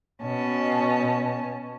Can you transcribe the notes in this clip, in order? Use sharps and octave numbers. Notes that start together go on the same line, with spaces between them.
B2 C#4 A5